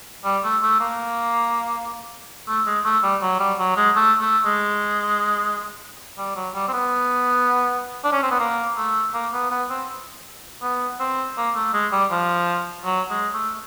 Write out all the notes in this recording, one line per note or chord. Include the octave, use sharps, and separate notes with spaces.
G3
A3
A3
A#3
A3
G#3
A3
G3
F#3
G3
F#3
G#3
A3
A3
G#3
G3
F#3
G3
C4
B3
D4
C#4
C4
B3
A#3
A3
A#3
B3
B3
C4
B3
C4
A#3
A3
G#3
G3
F3
F#3
G#3
A3